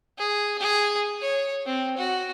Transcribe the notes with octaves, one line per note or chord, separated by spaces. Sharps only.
G#4
G#4
C#5
C4
F#4